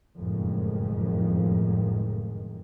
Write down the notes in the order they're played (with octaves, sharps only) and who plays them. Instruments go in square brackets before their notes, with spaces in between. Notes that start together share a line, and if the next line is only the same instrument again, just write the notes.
[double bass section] F#1 F2 A2 D#3 F3 G#3